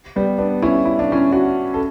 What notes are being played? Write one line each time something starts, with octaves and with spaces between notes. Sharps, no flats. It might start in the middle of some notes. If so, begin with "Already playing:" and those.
G3 B3
B3 D4
C#4 E4
E4
D4
C#4 E4
D4 F#4
A4